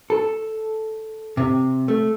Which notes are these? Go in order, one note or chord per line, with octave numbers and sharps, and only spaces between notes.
A4
C3
A3